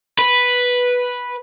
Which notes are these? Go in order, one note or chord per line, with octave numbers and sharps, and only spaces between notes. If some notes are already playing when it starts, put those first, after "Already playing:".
B4